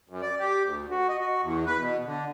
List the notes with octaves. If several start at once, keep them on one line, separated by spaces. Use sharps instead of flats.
F#2
D5
G4
D2
F#4
D#5
F#4
E2
B4
B2
D3